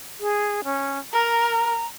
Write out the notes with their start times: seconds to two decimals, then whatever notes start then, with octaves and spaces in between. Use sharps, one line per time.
0.20 G#4
0.64 C#4
1.13 A#4 A#5